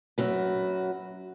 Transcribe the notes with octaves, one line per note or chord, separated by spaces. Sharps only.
F#2 F#4 B4